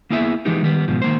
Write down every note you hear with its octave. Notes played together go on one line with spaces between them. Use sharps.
A#3 B3 E4 G#4 D5 E5
E3 F3 G#3 B3 D#4 G4
D#3 G3 B3
G#2 B2 F3
D#3 A#3 C5